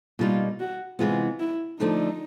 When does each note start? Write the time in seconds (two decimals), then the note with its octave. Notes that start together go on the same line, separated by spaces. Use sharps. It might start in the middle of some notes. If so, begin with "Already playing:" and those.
0.19 B2 G3 A#3 D#4 F4
0.60 F#4
0.99 C3 E3 G#3 B3 F4
1.40 E4
1.79 D3 F3 A3 D4 D#4